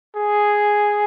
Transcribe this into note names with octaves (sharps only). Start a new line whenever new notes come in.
G#4